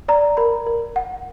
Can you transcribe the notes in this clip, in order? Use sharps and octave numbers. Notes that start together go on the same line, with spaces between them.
D5 A#5
A#4 B5
A#4
F#5